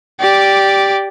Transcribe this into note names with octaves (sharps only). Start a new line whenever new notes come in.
G4 D5